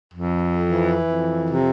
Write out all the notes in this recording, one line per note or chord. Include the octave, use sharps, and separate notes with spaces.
F2
E3
F2
C3